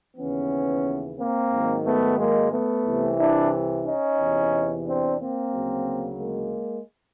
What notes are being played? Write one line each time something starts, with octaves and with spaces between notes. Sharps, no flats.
D#2 C#3 E3 B3 C#4
A#3 C4
G#2 D#3 F#3
A3 B3
G#3 A#3
A3 B3
C2 C3 E3
D4 E4
C#4 D#4
E2 C3 E3
C4 D4
A#3 C4
D2 C#3 F#3
G#3 A#3